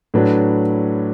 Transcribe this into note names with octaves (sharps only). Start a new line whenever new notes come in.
A2 F#3 D4 B4